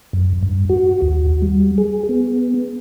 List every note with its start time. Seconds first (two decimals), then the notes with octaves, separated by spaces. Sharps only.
0.13 F#2
0.43 G2
0.69 F#4
1.02 D#2
1.42 G3
1.78 G#4
2.09 B3